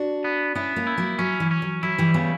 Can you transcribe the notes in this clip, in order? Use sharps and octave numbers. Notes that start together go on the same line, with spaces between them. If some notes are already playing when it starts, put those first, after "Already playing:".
Already playing: D4 F#4
B3
B3 C#4 E4
A#3 C#4
E4
F#3 A#3
F#3 C#4
E3
C#4
F#3
F#3 E4
E3 G3
C#3 G3 B3